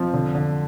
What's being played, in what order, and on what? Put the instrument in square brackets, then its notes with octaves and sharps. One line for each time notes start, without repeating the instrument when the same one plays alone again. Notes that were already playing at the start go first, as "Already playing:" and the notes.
Already playing: [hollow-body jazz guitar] F2 [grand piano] F3
[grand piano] D3
D3